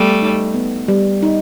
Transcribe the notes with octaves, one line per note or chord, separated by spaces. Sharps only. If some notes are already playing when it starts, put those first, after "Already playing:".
Already playing: G3 A3 B3
D#4
B3
G3
D#4